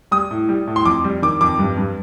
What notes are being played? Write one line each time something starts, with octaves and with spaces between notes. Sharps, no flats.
G3 D#6
A2
G3
A2
C6
F2 D6
G3
D#3 D6
F2 D6
G2
G2